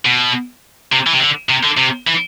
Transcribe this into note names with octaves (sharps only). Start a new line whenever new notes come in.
B2
C3
E3
C3
D3
C3
D3
C3
E3